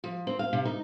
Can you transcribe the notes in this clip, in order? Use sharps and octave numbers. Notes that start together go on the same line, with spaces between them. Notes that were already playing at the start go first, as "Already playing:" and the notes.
F3
C4
F5
C3
D#4